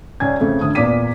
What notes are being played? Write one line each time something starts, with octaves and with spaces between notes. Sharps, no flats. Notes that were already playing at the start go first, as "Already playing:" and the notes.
C#2 C#5 D5 G#5 G#6
F2 C#3 A3
D2 D3 D#6
E2 A#2 D5 D6 B6 D#7